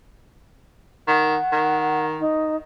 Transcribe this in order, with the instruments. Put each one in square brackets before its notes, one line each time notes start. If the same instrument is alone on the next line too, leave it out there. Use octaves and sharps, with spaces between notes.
[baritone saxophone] D#3 [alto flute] F#5
[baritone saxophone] D#3
[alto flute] D#4